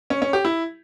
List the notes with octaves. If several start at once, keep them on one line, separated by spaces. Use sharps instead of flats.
C#4
C#4
G4
E4